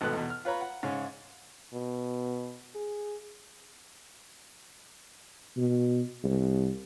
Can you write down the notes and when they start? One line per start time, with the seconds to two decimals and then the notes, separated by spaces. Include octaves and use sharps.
0.01 G#1 B2 A3 B4 F#6
0.13 E2 B2
0.30 F6
0.45 F4 B4 C#5 A#5 B5
0.61 F#5
0.83 G#2 C#3 C#4
1.74 B2
2.75 G#4
5.57 B2
6.24 C2